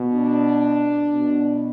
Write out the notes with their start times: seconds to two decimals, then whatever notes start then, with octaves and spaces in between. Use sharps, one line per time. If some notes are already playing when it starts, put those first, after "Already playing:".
Already playing: B2
0.13 D4
1.14 B2